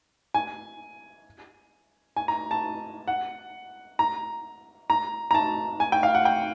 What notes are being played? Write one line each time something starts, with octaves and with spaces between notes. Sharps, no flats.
G#5
G#5
A#5
A5
F#5
A#5
A#5
A#5
A5
G#5
G5
F5
F#5
G5